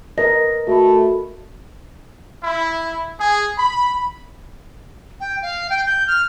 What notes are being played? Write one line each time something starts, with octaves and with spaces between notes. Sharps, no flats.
A#4 B4 D#5 A#6
A3 F#4 A4 B5
E4
G#4
B5
G5
F5
G5
G6
F6